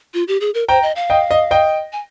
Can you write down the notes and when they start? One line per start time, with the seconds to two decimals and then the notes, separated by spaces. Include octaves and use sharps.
0.14 F4
0.28 G4
0.41 G#4
0.54 A#4
0.68 C5 G5 A#5
0.83 D#5
0.96 F5
1.10 D#5 G5
1.31 D#5
1.51 D#5 G5
1.93 G#5